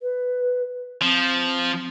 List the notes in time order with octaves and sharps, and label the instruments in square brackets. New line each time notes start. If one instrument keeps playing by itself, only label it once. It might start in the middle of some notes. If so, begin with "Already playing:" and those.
[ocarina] B4
[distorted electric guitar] F3 [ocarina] C4